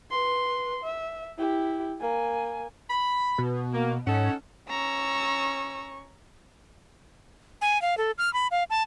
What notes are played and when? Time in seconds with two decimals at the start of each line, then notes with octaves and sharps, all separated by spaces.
0.11 B4 C6
0.84 E5
1.38 E4 G4
2.01 A#3 G#5
2.90 B5
3.38 B2
3.74 A#3
4.07 G#2 C#4 D#4 A4 F#5
4.69 C#4 A#5 C#6 E6
7.61 G#5
7.82 F5
7.98 A4
8.18 F6
8.34 B5
8.51 F5
8.70 A5